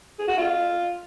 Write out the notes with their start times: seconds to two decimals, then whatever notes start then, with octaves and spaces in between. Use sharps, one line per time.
0.19 G#4
0.28 F#4
0.37 F4